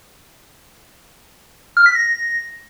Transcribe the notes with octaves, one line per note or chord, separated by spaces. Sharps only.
F6
B6
A#6